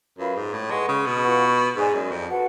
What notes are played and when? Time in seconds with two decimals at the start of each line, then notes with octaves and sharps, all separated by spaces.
0.18 F#2 F4 B4 F5 B5
0.36 G#2
0.54 A2
0.71 G#3 B4 F#5 C#6
0.89 C#3
1.06 B2
1.24 F4 B4 F#5 C#6
1.76 G#2 G#4 D5 G#5
1.94 F#2
2.11 F2
2.29 F#4 B4 F#5 A5